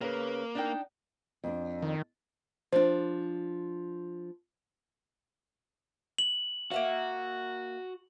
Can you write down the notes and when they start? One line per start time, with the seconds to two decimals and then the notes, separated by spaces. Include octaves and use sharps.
0.01 C#3 A#3 B4
0.55 D4 D#4 G5
1.44 F2 D4
1.82 D#3
2.72 F3 D4 C5
6.18 F#7
6.71 A#3 F#4 E5 F5